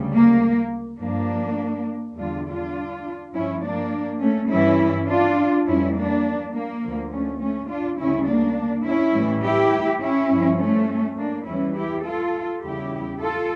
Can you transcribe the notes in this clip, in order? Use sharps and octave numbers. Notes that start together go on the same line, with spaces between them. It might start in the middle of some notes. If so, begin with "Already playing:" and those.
Already playing: D2 C#3 G3
A#3
G2 F3 A#3 D4
E2 D3 G3 D4 F4
D4 F4
G2 F3 C#4 E4
A#3 D4
A3 C#4
G2 E3 G3 C#4 E4
D4 F4
F2 E3 G3 C#4 E4
A#3 D4
A#3
D2 D3 F3
A3 C#4
A3 C#4
D4 F4
D2 C#3 G3 C#4 E4
A#3 D4
C#4 E4
A2 E3 G3
E4 G4
C#4 E4
G2 F3
A3 C#4
A#3 D4
E2 E3 G3 C#4 E4
E4 G4
F4 A4
E2 C#3 G3 E4 G4
F4 A4